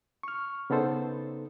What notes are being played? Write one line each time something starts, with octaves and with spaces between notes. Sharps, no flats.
C#6 F6
C#3 B3 D#4 A4 C5